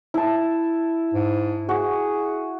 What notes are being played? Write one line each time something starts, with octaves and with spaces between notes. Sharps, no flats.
E4 A5
G#2
F#4 G#4